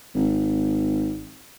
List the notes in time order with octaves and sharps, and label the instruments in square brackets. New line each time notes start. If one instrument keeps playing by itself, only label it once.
[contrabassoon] G#1